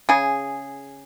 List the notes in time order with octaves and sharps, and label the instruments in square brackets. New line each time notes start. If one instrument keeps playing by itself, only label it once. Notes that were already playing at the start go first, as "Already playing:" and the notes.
[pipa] C#3 G#4